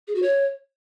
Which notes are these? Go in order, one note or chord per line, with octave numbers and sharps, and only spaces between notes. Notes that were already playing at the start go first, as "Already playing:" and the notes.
G#4
F#4
C#5